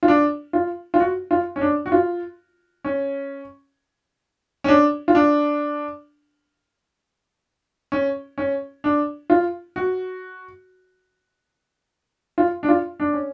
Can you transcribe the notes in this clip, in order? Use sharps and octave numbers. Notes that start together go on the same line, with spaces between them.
F4
D4
F4
F4
F#4
F4
C#4
D4
F#4
F4
C#4
C#4
D4
F4
D4
C#4
C#4
D4
F4
F#4
F4
D4
F4
D4
C#4